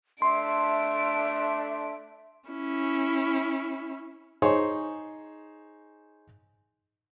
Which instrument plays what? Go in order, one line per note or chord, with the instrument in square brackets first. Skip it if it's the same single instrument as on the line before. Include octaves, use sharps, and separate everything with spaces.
[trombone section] A3 D4 [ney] E5 [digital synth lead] C6 [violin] D7
[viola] C#4 E4
[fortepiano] D#4 G#4 C5 C#5